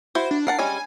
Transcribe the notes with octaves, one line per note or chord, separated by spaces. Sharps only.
E4 F#4 C5
D4
A#4 F#5 A5 C7
G3 G#3 C#4 G#5